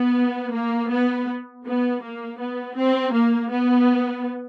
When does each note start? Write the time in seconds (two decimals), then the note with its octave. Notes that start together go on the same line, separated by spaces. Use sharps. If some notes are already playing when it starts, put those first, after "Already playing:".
Already playing: B3
0.54 A#3
0.91 B3
1.65 B3
2.02 A#3
2.39 B3
2.76 C4
3.13 A#3
3.50 B3